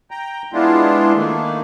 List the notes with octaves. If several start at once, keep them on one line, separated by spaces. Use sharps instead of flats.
G5 A#5
G#3 B3 D4 E4 F4
D#3 A3 A#3